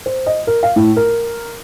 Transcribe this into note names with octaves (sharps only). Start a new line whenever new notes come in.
C5
D#5
A#4
F5
A2
A#4